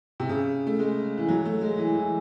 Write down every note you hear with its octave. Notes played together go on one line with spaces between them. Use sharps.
C3
C#3
A3
G#3
E3
F#3
A3
G#3
E3
E3